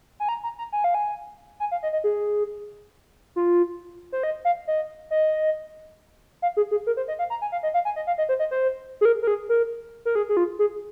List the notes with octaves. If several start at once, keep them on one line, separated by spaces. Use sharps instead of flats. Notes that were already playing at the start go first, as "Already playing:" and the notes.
G#5
A#5
A#5
A#5
G#5
F5
G#5
G#5
F5
D#5
D#5
G#4
F4
C5
D#5
F5
D#5
D#5
F5
G#4
G#4
A#4
C5
D#5
F5
A#5
G#5
F5
D#5
F5
G#5
D#5
F5
D#5
C5
D#5
C5
G#4
A#4
A#4
G#4
A#4
A#4
G#4
G#4
F4
G#4